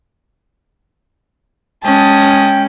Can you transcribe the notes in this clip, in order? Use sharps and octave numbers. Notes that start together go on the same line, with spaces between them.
G#3 C#4 G5 A5 D#6